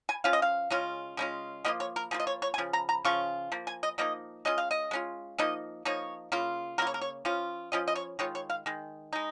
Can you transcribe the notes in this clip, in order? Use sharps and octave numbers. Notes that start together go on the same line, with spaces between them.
G#5
F3 C#4 F4 F5
D#5
F5
C#3 G#3 C#4 F4
C#3 G#3 C#4 F4
F3 A#3 F4 D#5
C#5
A#4
F3 A#3 F4 G#4
D#5
C#5
C#5
G#5
C#3 F3
A#5
A#5
C#3 F3 C#4 F4 C#6
F3 A#3
G#5
D#5
F3 A#3 D#4 D#5
G#3 C#4 F4 D#5
F5
D#5
G#3 C#4 F4
F3 A#3 D#4 D#5
F3 A#3 D#4 C#5
C#3 A#3 F4
C#3 A#3 F4 A#4
C#5
A#4
C#5
F3 C#4 F4
F3 C#4 F4 D#5
D#5
C#5
D#3 G#3 F4 C#5
C#5
F5
D#3 G#3
G#3 D#4